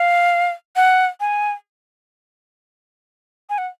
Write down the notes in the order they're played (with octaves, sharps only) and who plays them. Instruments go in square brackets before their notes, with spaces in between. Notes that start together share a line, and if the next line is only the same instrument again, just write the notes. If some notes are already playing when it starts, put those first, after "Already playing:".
Already playing: [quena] F5
F#5
G#5
G#5
F#5